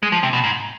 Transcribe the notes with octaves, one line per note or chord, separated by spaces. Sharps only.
G#3
F3
C3
B2
G#2